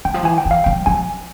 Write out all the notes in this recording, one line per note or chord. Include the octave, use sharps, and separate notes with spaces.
E3 G5
F3
E3 G#5
G5
E3
F5
F3 G5
F3 G#5